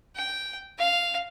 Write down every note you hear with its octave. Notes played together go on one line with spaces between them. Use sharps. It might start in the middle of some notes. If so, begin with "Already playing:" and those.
G5
F5